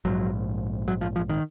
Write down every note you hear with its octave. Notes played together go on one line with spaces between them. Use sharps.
A#1 G#2 F#3
F#3
F3
F3
D#3